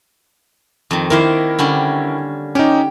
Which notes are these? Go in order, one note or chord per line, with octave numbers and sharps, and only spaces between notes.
F2 D#3
D#3 A#3 E4 A#4 C5
D3 G3 C#4
C#4 D#4 G4